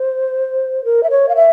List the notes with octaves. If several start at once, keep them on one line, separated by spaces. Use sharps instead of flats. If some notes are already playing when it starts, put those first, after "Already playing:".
Already playing: C5
A#4
E5
C#5
F5
E5